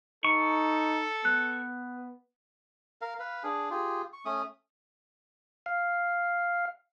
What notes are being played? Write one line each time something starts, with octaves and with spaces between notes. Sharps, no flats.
D#4 A4 C#6
B3 F#6
A#4 F5
B4 F5
D4 G#4
F4 G4 G#4
C#6
A3 C#4 D#6
F5